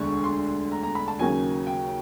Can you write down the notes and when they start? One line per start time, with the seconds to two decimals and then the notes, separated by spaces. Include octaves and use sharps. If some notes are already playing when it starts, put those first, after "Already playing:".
Already playing: E1 D2 D3 C#6
0.24 C6
0.72 A#5
0.83 A#5
0.95 B5
1.08 A5
1.19 D#2 C#3 F#3 A#3 C#4 G#5
1.67 G5